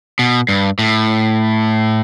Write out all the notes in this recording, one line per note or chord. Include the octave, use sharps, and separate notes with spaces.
B2
G2
A2